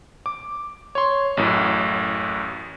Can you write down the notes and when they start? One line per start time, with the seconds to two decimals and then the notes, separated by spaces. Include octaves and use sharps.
0.26 D6
0.95 C#5 C6
1.37 A1 F#2 A2